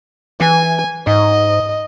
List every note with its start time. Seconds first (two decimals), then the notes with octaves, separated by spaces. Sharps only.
0.41 E3 G#5
1.07 G#2 D#5